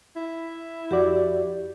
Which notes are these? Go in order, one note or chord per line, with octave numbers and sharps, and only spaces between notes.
E4
F2 F#4 G4 D5